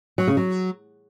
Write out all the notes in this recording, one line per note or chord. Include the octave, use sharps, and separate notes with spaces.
F#3
C#3
F#3